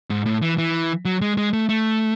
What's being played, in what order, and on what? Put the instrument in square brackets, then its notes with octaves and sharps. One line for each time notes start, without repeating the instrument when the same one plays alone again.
[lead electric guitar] G#2
A2
E3
E3
F#3
G#3
G#3
A3
A3